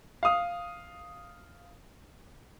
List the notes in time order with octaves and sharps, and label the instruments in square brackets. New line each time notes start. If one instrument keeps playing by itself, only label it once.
[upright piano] F5 D#6